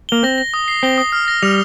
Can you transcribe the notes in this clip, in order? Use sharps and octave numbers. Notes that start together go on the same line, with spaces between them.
A#3 G7
C4 A#6
A#6
D#6
C7
C4 G7
D#6
F6
A#6
G3 F7